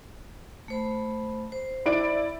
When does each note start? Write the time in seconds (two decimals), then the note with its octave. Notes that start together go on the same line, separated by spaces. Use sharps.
0.68 A3 C5 B5
1.52 C5
1.86 E4 D5 D7